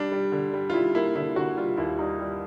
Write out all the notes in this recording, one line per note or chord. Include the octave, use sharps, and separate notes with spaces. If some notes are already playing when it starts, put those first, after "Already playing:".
Already playing: G3 D4
G3
D3
G3
F4
G3 E4
A#3 E4
D3 E4
D3 F#4
G3 F4
D#2 E4
G3 D#4
G3